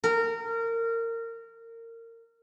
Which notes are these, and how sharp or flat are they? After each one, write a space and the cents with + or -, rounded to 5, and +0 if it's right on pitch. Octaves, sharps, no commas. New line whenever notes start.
A#4 -25